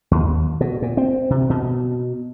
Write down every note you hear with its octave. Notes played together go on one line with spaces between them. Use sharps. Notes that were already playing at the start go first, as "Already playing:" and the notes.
D#2
B2
A#2
C4
C3
B2